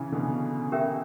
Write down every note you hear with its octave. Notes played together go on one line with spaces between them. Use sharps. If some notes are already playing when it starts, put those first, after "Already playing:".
Already playing: C#3 E3
B2 D3
C#4 G4 A#4 E5 G5